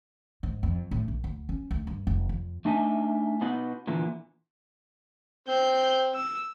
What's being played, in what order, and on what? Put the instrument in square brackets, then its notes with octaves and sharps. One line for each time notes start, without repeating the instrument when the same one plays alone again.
[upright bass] G#2
F2
A2
A#1
D2
C#4
D2
G2
F1
F2
[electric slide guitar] A3 D4 D#4 E5 G#5
B2 B3 D#4 F#5
A#2 D3 E3 B3
[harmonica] C4 [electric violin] G6
[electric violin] E6